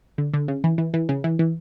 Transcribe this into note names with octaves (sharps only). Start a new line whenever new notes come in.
D3
D3
C#3
E3
E3
E3
C#3
E3
E3